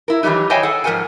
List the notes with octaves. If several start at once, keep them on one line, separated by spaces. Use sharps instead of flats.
E4 A#4
D#3 E3 F#3 G3 D#4
C5 C#5 D#5 E5 G5 G#5
G#4 A4 F#5
G#2 F3 A#4 C5 F#5 G#5